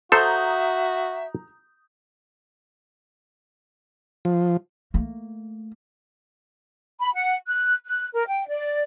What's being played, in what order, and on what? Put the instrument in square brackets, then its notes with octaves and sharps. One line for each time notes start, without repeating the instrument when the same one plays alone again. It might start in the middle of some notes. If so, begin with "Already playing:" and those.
[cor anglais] F#4 [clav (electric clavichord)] A4 C5 [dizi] E5 [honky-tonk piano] A#5 D#6 G6
[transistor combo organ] F3
[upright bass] A3 A#3
[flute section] B5
F#5
F#6
F#6
A#4
G5
D5